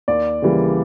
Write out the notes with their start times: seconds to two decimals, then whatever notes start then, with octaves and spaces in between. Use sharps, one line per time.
0.08 D#2 D5
0.42 C#3 E3 G3 A#3